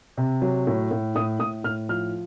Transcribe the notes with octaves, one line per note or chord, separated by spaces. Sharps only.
C3
F#3
A2
A2
A2 D#6
A2 D#6
A2 F6
F3 F6